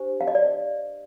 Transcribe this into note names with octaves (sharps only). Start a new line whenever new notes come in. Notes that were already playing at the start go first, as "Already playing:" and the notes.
Already playing: D4 G4 C5
F5
D#5
D5